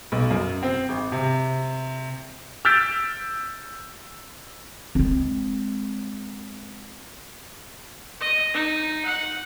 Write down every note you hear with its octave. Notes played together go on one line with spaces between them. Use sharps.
B1
F#2
C4
G#1
C3
E6 F6 G6 A6 B6 D7
G#3 C4
D#5
D#4
F#5